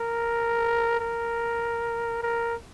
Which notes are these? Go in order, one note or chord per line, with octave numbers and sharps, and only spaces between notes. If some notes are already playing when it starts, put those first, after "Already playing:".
Already playing: A#4
A#4
A#4